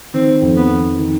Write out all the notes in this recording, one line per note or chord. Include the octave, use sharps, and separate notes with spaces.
D#3 C4
F2
B3
F2
D#3